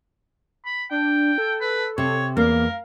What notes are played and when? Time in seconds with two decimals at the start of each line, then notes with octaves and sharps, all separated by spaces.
0.65 B5
0.90 D4 G5
1.38 A4
1.60 B4
1.98 C3 C#5
2.37 E2 A#3 A#4 F5